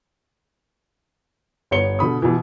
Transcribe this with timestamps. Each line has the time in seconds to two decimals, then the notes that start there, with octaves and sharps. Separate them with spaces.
1.71 G1 B3 C#5 C#7 G7
1.99 B2 D3 B5 D#6
2.22 B2 E3